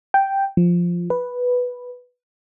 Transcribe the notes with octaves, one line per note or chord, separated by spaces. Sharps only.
G5
F3
B4